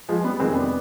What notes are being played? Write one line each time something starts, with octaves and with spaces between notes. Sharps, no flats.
F3 G#3
G3 B3
F2 C3 D#3 G#3 C4
B3 D4